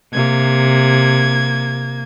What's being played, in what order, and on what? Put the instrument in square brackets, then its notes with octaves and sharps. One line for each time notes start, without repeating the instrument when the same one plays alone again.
[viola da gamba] C3 [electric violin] A#3 G#6